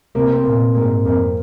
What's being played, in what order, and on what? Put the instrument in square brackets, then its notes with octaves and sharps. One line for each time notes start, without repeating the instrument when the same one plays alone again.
[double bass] C3 [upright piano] A#3
[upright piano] C4
[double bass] A#2 [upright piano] A#3
[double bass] G#2 [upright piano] A#3
[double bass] F2 [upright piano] A#3